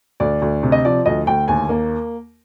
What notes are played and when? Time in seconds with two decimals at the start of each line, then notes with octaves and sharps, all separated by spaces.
0.20 D2 D5
0.42 D2
0.63 C3
0.72 D#5
0.85 F3 D5
1.06 D2 D#5
1.27 D2 G5
1.48 D#2 G#5
1.69 A#3